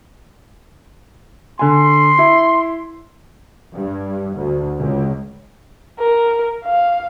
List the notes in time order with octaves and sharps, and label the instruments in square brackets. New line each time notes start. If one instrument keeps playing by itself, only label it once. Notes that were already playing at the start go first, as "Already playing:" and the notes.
[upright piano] D3 G#5 [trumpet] C6
[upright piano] E4
[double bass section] G2
D2
C#2
[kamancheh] A#4
F5